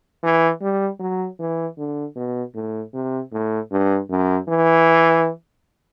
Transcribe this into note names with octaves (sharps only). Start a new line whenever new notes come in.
E3
G3
F#3
E3
D3
B2
A2
C3
A2
G2
F#2
E3